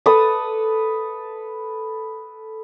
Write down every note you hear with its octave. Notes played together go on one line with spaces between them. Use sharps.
A4 B4 D#6